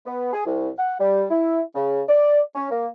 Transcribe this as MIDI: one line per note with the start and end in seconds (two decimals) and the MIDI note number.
0.06 0.30 59
0.33 0.45 68
0.46 0.69 36
0.78 0.94 78
0.99 1.24 55
1.30 1.61 64
1.75 2.01 49
2.08 2.40 74
2.56 2.68 61
2.71 2.87 58